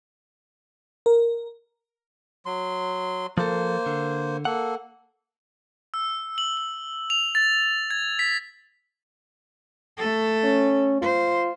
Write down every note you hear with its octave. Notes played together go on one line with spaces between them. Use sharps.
A#4
F#3 C6
F3 A#3 A4 C5
D3
A#3 A4 F#5
E6
F#7
F#7
F7
A6
G#6
B6
A3 A4
C#4
F4 C5